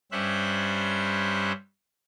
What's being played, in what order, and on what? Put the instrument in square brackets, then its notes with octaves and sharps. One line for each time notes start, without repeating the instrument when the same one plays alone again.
[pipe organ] G2 G3 C#4 C5 E5 F#6